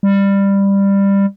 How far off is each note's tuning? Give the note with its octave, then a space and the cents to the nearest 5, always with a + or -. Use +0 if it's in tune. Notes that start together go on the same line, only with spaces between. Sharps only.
G3 +15